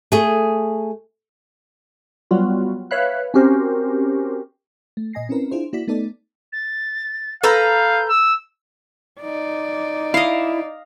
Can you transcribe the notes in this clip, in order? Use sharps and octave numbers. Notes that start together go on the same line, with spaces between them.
A3 G#4
F#3 G3 B3 F4 F#4
B4 C#5 E5 F5 B5 F#6
C4 C#4 F#4 G4 A#4 C5
A3
A#2 D#5 G#5 A#6 C7
C4 C#4 E4 A#4 B4
D4 E4 F4 G#4 C5
A#3 E4 F#4 D5 B6
A3 B3 D#4 A4 D5
A6
A4 B4 F5 A#5 G6
E6
D#4 D5
E4 D#5 F5